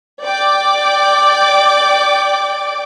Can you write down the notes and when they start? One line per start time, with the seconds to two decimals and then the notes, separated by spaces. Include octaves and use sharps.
0.24 D5 G5 D6